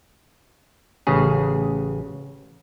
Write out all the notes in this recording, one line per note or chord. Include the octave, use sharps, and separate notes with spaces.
A1 C#3 G#4